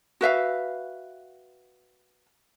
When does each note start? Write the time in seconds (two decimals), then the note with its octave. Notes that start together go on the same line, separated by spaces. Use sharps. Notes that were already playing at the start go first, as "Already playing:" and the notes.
0.21 F#4 B4 E5 F5